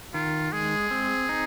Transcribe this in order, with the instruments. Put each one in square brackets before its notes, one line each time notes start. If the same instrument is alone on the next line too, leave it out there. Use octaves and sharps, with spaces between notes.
[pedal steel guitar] D#3 [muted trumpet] F4
[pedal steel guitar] G#3 [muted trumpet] G#4
[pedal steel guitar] C4
D#4